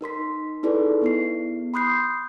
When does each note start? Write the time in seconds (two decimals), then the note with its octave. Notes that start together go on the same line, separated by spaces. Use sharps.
0.01 D#4 A#4 C6 B6
0.63 D#4 E4 G#4 A4 B4 D5
1.02 B3 E4 C7
1.74 B5 C6 D#6 F#6 G6 C7